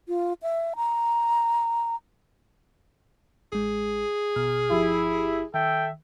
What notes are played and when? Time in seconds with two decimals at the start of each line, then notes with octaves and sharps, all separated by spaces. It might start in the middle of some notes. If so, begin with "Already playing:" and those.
0.08 F4
0.43 E5
0.76 A#5
3.53 A1 G#3 G#4
4.36 G#1 B2 F6
4.71 G1 F3 E4 G4
5.54 D#3 A4 E5 G5